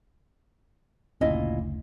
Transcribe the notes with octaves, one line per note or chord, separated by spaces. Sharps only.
F#1 D2 A#2 C#4 E4 D#5